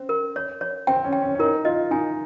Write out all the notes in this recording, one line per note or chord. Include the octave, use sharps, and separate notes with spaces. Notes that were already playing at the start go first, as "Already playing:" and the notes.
Already playing: C4 C#4
A#4
C#5
C#5
C4 G5
C#4
G5
C#4
C#4
D#4 A#4
F4 D#5
D#4 G#5